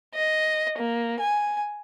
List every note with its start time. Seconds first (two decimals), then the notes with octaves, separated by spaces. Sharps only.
0.15 D#5
0.77 A#3
1.20 G#5